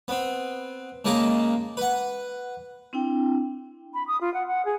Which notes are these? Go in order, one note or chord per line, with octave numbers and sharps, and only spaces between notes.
B3 C4
C#3 G#3 A#3 D#4 A5 A#5
B4 F#5
C4 D4 E4 G5
B5
D#6
F4
F#5
F#5
G#4